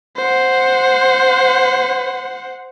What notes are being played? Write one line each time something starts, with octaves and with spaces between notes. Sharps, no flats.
C5 F#5